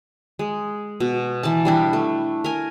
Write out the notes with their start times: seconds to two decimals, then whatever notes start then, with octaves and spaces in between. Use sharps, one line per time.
0.39 G#3
1.00 B2
1.43 E3 D5 A5
1.65 G3 D4 E4
1.93 A3
2.44 A#4 G#5